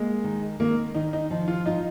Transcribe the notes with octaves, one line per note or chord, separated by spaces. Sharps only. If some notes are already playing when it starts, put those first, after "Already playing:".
Already playing: G#3 A#3
D#3
D#3 A#3
D#3 D#4
D#4
F3
F4
D#4 F4